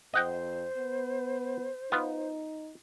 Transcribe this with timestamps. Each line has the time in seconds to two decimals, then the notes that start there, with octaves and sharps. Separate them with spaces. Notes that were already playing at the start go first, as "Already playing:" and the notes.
0.14 F2 C5 D#5 F#5 G5
0.77 B3
1.92 B3 D#4 F4